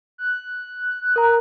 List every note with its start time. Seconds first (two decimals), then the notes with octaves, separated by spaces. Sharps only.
0.18 F#6
1.16 A#4 A#5